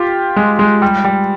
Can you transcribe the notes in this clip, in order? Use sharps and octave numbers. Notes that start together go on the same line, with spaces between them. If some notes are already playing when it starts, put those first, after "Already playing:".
Already playing: F4 G4
G#3
G#3
G3
G3